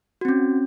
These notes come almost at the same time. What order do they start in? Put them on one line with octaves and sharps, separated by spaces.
F#4 C4 C#4